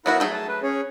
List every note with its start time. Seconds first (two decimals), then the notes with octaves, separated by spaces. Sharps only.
0.06 F#3 B3 E4 F#4 A#4 F#5
0.20 F#3 A3 G#4 G6
0.33 A5
0.48 B4
0.63 C#4 G#4 C#5